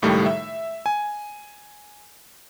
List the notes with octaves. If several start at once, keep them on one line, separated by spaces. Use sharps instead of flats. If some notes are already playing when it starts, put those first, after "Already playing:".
C#2 A2 D#3 G3 A3
E5
G#5